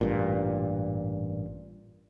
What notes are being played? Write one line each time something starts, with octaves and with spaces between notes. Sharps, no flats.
A1 G2 A#2